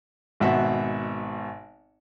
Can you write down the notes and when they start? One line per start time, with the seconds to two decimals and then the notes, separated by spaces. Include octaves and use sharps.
0.40 G#1 B2 E5 F#5